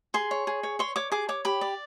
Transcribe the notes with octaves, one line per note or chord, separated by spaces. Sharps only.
G#4 C6
C#5
G#4
C#5
C#5 C6
C#5 D6
G#4 D6
C#5 D6
G4 B5
D5